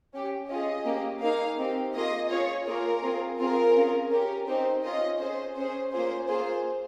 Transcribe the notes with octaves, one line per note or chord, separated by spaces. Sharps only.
C#4 G4
C#4 F4 G#4 D#5
A#3 C#4 G4
A#3 D#4 G#4 F5
C4 D#4 G4
A#3 F4 G#4 D#5
C#4 F4 G#4 C#5
A#3 F4 G#4 A#4
C4 F4 G#4
C4 F4 G#4 A#4
C#4 F4 G#4
C#4 G4 A#4
C4 D#4 G4 C5
C#4 F4 G#4 D#5
C#4 G#4 C5
C#4 G#4 C5
A#3 C#4 F4 G#4 C5
A#3 F4 G#4 C5